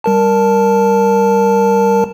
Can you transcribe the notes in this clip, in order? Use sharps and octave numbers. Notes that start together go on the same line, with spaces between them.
G3 A#4 A5